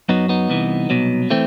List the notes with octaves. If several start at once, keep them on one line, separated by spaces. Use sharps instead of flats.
F#2 F#3 B3 D#4
B3 D#4
C2 C3 E3
C2 B2 F#3
E3 A3 C4